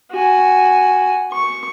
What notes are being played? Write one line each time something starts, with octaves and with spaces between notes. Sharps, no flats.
F#4 G#5
C#6